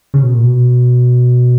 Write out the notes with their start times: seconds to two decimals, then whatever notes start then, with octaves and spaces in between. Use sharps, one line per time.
0.14 C#3
0.23 B2
0.33 A#2
0.43 B2